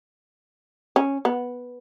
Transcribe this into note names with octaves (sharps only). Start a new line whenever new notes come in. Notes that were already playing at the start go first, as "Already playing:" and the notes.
C#4
B3